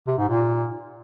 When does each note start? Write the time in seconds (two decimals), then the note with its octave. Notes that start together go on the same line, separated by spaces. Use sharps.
0.07 C3
0.18 G#2
0.29 A#2